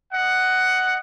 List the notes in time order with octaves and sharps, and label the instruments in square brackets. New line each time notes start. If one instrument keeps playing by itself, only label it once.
[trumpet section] D#5 F#5